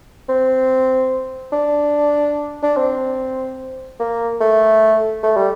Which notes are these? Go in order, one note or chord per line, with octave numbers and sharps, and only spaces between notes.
C4
D4
D4
C4
A#3
A3
A3
G3